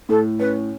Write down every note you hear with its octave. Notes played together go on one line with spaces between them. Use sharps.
A2 A4
C#4 B4